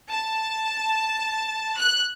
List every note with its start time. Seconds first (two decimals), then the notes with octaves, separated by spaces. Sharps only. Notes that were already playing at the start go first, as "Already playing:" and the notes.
0.10 A5
1.77 F#6